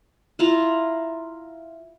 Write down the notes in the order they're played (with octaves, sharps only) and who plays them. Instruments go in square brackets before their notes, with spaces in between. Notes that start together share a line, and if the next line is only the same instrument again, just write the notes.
[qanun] E4 F4 A#5